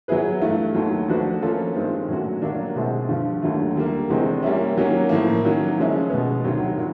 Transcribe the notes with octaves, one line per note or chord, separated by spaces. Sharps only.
F#3 B3 E4 G#4 B4
G2 E3 A3
D#2 D#3 F#3 A3
F3 A3 D4 F#4 B4
F3 A#3 C#4 F4 A4
G2 D#3 G#3 C4
A#2 F#3 A3 C#4 F#4
G2 D3 F#3 A#3 D4
B2 G#3 C4 E4
G2 D3 F3
D#2 D3 F#3 A3
D3 G3 A#3
E2 C3 E3 G#3 C4
G3 A#3 C#4 E4
D#3 F#3 A#3 C#4
A2 F3 A#3
D#3 F#3 A#3 C#4
C#3 F3 G#3 C#4 E4
B2 G#3 B3
D2 C3 D#3 F#3
A#2